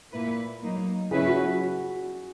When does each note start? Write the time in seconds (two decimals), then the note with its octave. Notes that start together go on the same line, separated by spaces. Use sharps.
0.12 A#2 A#3 E4 B4
0.62 F#3 A#3 D#4
1.11 C#3 F#3 C#4 E4 G#4 B4
1.27 F#4
1.45 F#4